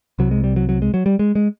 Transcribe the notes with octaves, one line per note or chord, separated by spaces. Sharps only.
C2 C3 F#3
G#3
G3
F#3
F#3
G#3
F#3
G3
G#3
G#3